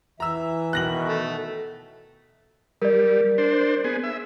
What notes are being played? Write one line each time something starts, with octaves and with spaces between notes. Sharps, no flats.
E3 E5 A#5 E6
B2 D#3 F#6 A#6 F#7
A3
G3 A#4 D5
D4 C5
B3 G#4
E5